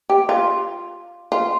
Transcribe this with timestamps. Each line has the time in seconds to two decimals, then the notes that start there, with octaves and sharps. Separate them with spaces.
0.10 G4
0.29 F4
1.32 F4